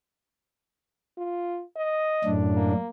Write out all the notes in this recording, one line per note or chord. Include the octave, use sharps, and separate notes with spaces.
F4
D#5
F#2 A2 D4
A#3